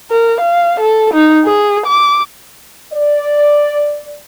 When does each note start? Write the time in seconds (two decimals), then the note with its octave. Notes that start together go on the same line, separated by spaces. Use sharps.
0.11 A#4
0.41 F5
0.80 A4
1.14 D#4
1.45 G#4
1.86 D6
2.92 D5